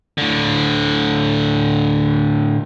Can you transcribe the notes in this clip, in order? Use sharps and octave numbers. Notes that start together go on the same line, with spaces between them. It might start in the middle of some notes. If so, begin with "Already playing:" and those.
A2 D3